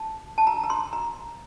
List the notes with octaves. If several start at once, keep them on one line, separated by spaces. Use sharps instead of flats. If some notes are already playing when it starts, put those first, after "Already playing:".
Already playing: A5
A5
A#5
A#5
C6
A#5